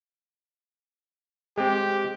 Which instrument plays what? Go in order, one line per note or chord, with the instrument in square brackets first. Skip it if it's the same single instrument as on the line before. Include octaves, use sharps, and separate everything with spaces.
[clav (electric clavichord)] G#3 C4 [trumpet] G4